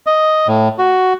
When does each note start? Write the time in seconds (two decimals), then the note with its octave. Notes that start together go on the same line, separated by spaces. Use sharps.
0.07 D#5
0.48 A2
0.79 F#4